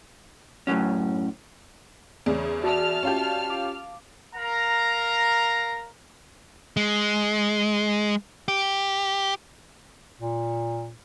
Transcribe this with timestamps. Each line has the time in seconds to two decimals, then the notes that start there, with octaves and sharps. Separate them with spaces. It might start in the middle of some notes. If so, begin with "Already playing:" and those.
0.67 F#2 A2 D3 F#3 C#4
2.26 E2 C#3 D5
2.63 F#4 D5 E5 A5 F6
3.03 C#4 F4 G4
3.50 F5 D6
4.36 A#4 F5 A#5
6.77 G#3
8.48 G4
10.20 A#2